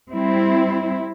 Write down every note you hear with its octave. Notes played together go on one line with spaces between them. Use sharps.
G3 C4 E4